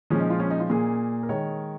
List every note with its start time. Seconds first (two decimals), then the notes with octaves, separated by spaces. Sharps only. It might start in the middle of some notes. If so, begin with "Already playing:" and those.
0.10 A#2 F3 G#3 C#4
0.20 D#4
0.30 F4
0.40 C#4
0.51 D#4
0.60 F4
0.70 A#2 A#3 G#4
1.23 A#4
1.29 D#3 G#3 C#5